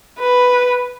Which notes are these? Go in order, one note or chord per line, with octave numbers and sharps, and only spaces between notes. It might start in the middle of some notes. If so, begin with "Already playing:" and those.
B4